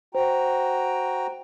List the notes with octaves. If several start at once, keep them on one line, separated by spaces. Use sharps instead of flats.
F#4 C5 G5 A#5